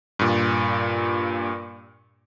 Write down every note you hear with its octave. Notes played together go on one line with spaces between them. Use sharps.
G2 A#2